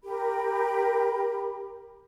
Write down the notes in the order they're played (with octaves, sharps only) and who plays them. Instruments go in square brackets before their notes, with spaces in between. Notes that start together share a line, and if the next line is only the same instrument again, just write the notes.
[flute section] G4 A#4 B5